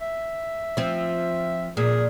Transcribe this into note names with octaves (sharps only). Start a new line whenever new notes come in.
E5
F3 C4
A#2 G#4